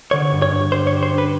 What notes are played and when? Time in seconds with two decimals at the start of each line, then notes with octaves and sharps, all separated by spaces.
0.11 D3 C#5
0.31 G2
0.42 C#5
0.52 G2
0.72 G4 C5
0.87 C#5
0.92 G4
1.03 C5
1.13 D4
1.18 B4